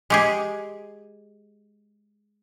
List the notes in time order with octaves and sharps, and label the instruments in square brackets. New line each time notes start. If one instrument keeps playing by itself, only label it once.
[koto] G#3 G4 G#4